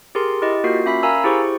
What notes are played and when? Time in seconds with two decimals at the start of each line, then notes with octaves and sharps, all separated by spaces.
0.15 G4 G#4 A#4 C6
0.42 E4 G4 D#5
0.64 A#3 F4 F#4 A#4 C7
0.86 C#4 E5 B5 B6
1.03 A#4 F5 G#5 A#5 B5 E6
1.24 E4 G4 G#4 C5 C#6